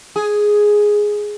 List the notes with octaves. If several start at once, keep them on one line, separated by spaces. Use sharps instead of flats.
G#4